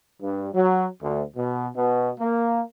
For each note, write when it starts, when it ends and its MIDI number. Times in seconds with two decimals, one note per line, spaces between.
0.21 0.50 43
0.53 0.86 54
1.01 1.23 38
1.36 1.67 47
1.76 2.10 47
2.19 2.61 58